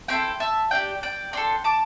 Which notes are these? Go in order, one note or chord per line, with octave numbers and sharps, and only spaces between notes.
C4 E4 A4 G5 C6
E5 A5
D4 G4 D5 G5
D5 G5
D4 A4 G5 C6
A5 D6